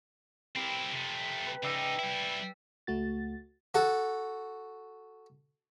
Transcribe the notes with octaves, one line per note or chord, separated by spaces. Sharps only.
C4 E4 G4 A#4 B5
C3 A3
B4
C#3 D#4 D5 E5 G5
G3 E4
C#2 A3 F#4 A6
F#4 A4